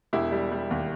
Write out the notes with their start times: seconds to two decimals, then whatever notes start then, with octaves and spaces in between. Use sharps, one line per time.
0.13 E1 E4 G4
0.32 G3
0.52 G3
0.71 D#2